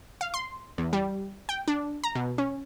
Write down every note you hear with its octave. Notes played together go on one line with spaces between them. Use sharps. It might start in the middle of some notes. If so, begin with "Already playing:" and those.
F5
C6
E2
G3
G5
D4
A#5
B2
C#4